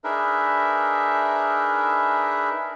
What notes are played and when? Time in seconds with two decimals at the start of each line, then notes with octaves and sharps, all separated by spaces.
0.04 D4 D#4 G#4 A#4 B4 E5